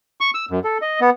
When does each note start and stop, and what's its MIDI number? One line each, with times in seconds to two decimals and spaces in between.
0.20 0.30 85
0.34 0.45 88
0.51 0.60 42
0.64 0.78 69
0.82 1.00 75
1.01 1.10 59